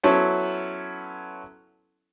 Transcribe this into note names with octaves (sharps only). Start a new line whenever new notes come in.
F#3 B3 C#4 E4 A4 C5